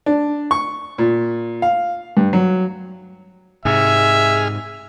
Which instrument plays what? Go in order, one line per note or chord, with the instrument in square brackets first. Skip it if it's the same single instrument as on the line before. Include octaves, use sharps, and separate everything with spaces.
[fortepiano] D4
C#6
A#2
F5
G2
F#3
[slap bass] G#2 C3 [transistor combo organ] G#3 G#4 F6 [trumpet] E5